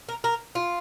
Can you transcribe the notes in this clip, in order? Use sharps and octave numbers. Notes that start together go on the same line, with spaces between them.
A#4
A#4
F4